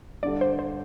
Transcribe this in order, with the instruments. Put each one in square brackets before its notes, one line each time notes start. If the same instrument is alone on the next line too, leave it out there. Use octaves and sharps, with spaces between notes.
[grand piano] G2 D3 G3 [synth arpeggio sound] D5
[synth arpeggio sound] C5
C5